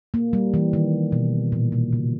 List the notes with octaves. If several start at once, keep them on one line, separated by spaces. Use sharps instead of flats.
A#3
G3
E3
D#3
B2
A#2
B2
C#3